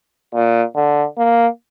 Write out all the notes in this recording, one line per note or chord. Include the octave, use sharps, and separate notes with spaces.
A#2
D3
A#3